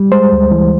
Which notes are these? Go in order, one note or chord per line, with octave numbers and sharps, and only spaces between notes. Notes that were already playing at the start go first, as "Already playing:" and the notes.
Already playing: G3
G#3 C5
D2
E3